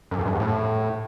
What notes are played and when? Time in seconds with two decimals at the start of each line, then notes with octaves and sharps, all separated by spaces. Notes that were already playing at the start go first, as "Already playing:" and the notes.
0.11 F#2
0.18 F2
0.26 G2
0.33 E2
0.40 A2